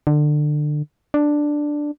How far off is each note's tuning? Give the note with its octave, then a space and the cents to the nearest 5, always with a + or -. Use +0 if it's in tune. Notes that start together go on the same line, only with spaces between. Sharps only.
D3 +25
D4 +5